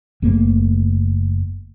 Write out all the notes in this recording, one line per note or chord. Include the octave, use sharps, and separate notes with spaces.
F#1 A3 A#3